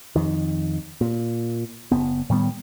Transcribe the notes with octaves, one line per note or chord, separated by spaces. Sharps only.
F2 D#3
A#2
F#1 B3
A2 D#3 G3 B3